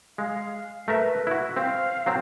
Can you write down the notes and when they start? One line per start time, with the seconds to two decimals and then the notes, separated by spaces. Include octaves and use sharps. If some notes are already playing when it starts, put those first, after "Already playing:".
0.18 G#3 F5
0.88 A3 A#4 B4 E5
1.27 E4 F#4
1.57 C4 F5
2.06 F#3 C4